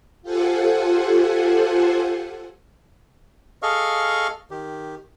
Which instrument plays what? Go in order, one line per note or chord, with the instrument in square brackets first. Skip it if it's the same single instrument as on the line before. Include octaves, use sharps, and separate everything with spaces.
[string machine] F4 G4 A4 C5 F#5 G#5
[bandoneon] G#4 A4 D#5 F5 C#6 F6
D#3 G4